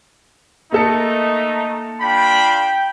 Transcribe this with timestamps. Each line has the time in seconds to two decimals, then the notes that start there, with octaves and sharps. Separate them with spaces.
0.72 A3 A#3 D#4 A4 C#7
2.02 D4 F4 G5 B5